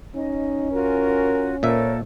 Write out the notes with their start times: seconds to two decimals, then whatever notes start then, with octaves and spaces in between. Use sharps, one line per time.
0.15 C#4 D#4 D#5
0.72 F4 F#4 A#4 G#5
1.63 A#2 A4 A#4 C5 C#5 E5